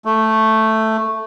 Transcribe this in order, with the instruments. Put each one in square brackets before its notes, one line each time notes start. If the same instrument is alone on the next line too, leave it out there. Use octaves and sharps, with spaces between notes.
[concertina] A3